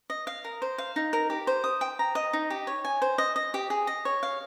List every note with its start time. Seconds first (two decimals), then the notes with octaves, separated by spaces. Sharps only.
0.10 D#5
0.27 F5
0.45 A#4
0.62 C5
0.78 F5
0.96 D#4
1.13 A#4
1.30 G4
1.47 C5
1.64 D#6
1.81 G5
1.99 A#5
2.15 D#5
2.33 D#4
2.50 G4
2.67 C#5
2.85 G#5
3.02 C5
3.18 D#5
3.36 D#5
3.54 G4
3.70 G#4
3.87 D#5
4.05 C#5
4.23 F5